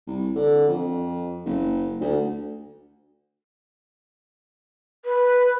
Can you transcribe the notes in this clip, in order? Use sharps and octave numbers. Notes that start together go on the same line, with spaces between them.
C2
D3
F2
F#1
D2
B4